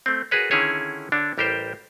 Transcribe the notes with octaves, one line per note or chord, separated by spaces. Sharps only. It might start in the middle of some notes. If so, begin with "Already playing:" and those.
A3 C4
F#4 G#4 A#4 B4 C#5
D3 D#3 C#4 E4 G#4 C#5
D3 D4 C#5
A1 G3 G4 A#4 C5 G5